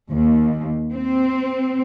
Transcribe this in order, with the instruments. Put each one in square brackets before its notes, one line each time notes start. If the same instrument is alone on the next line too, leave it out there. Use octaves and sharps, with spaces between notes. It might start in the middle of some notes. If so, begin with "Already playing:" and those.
[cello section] D#2
C4